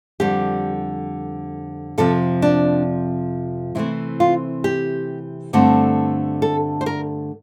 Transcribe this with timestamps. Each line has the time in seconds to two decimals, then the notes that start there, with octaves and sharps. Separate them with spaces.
0.20 F2 D3 G3 G4
1.98 F2 C3 F3 A4
2.42 D4
3.75 C3 E3 A3 C4 E4
4.20 F4
4.64 G4
5.53 G2 D3 A3 C4
6.42 A4
6.81 C5
6.86 A#4